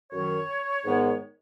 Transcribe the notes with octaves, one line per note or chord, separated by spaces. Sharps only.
F#2 D#3 F#3 C#5
G#2 D#3 G#3 B3